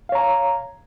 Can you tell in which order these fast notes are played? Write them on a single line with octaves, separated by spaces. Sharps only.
F5 C#5 A#5